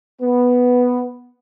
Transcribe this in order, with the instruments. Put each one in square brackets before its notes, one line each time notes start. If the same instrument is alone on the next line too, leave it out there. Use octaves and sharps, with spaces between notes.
[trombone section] B3